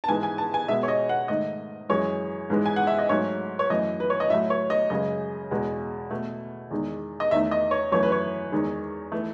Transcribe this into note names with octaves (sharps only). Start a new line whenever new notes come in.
A5
G#2 E3 G#3 G#5
G#5
A5
G#5
B2 G#3 E5
C#5
D#5
F#5
G#2 D#3 A3 D#5
F#2 E3 G#3 C#5
G#2 E3 G#3
G#5
F#5
E5
D#5
G#2 F#3 A3 C#5
C#5
F#2 E3 A3 D#5
B4
C#5
D#5
A2 F#3 A3 E5
C#5
D#5
F#2 C#3 G#3 D#5
E2 B2 G#3
B2 A3
E2 D#3 G#3
D#5
E2 D#3 A3 E5
D#5
C#5
F#2 E3 A3 C#5
B4
C#5
E2 D#3 G#3
E3 A3